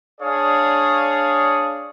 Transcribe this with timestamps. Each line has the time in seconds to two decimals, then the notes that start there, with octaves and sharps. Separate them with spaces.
0.21 D4 G#4 C#5 D5 F5 D#6